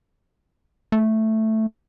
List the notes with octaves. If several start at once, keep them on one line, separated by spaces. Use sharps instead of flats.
A3